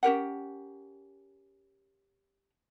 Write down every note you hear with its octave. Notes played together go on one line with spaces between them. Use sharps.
C#4 G4 A#4 F#5